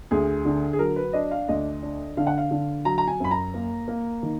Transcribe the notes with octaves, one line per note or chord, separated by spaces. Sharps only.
D2 G#4
D3
G#4
F#3 A#4
B4
D4 D#5
F5
D2 D#5
D4
D3 F5
F#5
F5
D3
F#3 A#5
A#5
G#5
F#2 B5
A#5
A#3
A#3
D#3